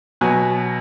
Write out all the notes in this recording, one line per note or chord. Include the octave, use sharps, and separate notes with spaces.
B2 F#3 B3 G#5